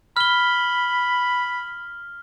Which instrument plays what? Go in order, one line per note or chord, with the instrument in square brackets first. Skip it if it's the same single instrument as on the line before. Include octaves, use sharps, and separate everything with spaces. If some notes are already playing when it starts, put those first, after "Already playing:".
[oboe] B5 [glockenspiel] F6 G7